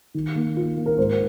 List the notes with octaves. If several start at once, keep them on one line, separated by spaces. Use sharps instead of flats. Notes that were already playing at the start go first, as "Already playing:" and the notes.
D#3
A#3
F4
A#3
A#4
G#2 C5